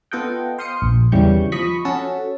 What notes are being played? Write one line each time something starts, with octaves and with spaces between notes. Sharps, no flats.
B3 F4 A4 D#5 F#5 G5
C5 F5 C6 D#6 C7 C#7
A#1
E2 C#3 E3 G3 C#6 G6
F3 D#5 B5 C#6 B6
C#4 F#4 A4 A5